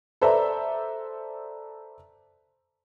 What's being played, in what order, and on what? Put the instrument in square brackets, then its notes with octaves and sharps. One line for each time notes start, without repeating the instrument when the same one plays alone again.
[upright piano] A4 B4 C5 D5 E5 A#5